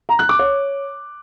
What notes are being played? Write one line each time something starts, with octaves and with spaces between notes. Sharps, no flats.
A#5
F#6
D6
C#5